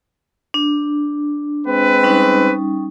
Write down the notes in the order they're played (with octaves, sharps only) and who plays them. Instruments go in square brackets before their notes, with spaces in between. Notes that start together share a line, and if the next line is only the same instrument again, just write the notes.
[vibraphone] D4
[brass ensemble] G#3 C4 B4
[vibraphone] G3 C#4 D#4